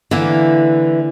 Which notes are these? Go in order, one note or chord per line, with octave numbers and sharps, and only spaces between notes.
D3 E3 A#3 E4